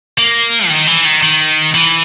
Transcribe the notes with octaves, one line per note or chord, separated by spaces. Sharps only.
A#3
E3
D#3
E3
D#3
D#3
E3